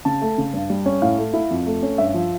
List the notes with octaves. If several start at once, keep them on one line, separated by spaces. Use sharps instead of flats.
C#3 A5
A3
C#3
G2
G3
C#4
A2 F5
A3
E4
F2
A3
C#4
G2 E5
F3